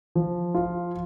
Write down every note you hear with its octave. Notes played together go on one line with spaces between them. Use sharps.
F3
F4